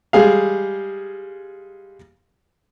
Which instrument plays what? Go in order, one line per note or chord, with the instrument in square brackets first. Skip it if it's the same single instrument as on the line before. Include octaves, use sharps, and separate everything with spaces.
[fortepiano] G3 G#3 G#4 F5